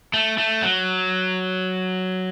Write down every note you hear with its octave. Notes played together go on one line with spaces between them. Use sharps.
A3
A3
F#3